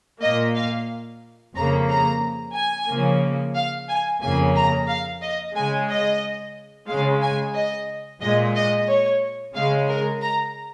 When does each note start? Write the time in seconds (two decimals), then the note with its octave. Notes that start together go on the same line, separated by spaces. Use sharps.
0.22 A#2 A#3 D#5
0.56 F5
1.55 F2 C#3 A#3 A#5
1.89 A#5
2.55 G#5
2.89 C#3 F3 A#3
3.56 F5
3.88 G#5
4.22 F2 C#3 A#3 G#5
4.55 A#5
4.88 F5
5.22 D#5
5.55 C#3 G#3 G#5
5.88 D#5
6.88 C#3 G#3 F5
7.22 G#5
7.55 D#5
8.21 A#2 G#3 D#5
8.55 D#5
8.88 C#5
9.55 C#3 G#3 F5
9.89 A#4
10.22 A#5